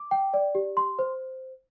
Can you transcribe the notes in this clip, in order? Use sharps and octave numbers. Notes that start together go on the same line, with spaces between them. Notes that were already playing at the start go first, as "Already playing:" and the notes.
Already playing: D6
G5
D5
G4
C6
C5